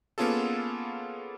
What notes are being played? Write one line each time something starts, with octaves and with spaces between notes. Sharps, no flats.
A#3 B3 C#4 F4 G#4 A4